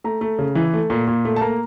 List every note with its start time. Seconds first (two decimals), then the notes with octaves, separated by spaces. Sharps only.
0.04 A3 A#5
0.21 A3
0.39 C#3
0.55 E3
0.73 A3
0.90 A#2
1.07 A#2
1.25 A3
1.36 A5
1.41 A#3 A#5